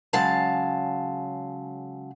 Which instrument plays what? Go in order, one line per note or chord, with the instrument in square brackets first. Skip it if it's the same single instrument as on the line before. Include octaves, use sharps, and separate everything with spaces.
[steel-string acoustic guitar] C#3 F#3 G#3 F5 A5